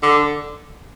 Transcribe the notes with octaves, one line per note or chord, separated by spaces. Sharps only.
D3